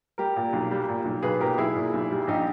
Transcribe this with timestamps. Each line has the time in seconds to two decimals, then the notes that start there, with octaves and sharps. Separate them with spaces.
0.18 G3 G4 A#4
0.36 A#2
0.53 B1
0.71 G3
0.89 A#2
1.05 B1
1.23 B1 G#4 B4
1.40 A#2 G4 A#4
1.58 B1 E4 G#4
1.75 A#2
1.93 B1
2.11 G3
2.27 A#1 D#4 G4